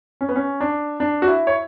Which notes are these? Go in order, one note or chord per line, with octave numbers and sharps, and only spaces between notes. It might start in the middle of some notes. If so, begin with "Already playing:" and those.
C#4
B3
C#4
D4
D4
F#4
E4
C#5